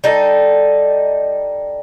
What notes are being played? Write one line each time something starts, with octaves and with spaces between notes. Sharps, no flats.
G3 D#4 A4